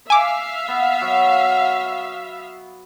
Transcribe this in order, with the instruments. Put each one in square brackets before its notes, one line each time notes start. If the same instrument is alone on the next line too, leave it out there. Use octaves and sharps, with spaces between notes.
[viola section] E5 F5 [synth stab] G#5 D6
[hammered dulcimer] B3
F#3